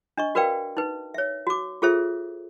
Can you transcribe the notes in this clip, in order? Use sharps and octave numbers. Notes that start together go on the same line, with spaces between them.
D4 D#5 C#6
F#4 A#4 B4 D5 F5 G5
D#4 B4
C#5 E5
F#4 D6
F4 G#4 A4 C5 E5